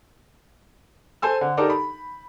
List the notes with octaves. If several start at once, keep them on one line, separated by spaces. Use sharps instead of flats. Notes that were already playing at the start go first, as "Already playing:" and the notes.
A4 C5 G#5 E6
D3
D4 D#4 G4 A4 A#4
B5